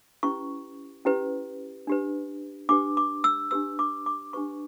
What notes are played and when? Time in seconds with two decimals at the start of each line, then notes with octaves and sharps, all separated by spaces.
0.23 C#4 E4 G4 B4 C#6
1.05 C#4 E4 G4 B4
1.87 D4 G4 B4
2.69 D4 G4 B4 D6
2.97 D6
3.24 E6
3.51 D4 G4 B4 E6
3.79 D6
4.06 D6
4.33 D4 G4 B4 C#6